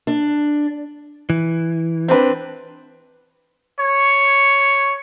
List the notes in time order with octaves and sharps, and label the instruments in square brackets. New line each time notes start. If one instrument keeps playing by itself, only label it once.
[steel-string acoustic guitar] D4
[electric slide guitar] E3
[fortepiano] C4 D4 B4
[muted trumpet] C#5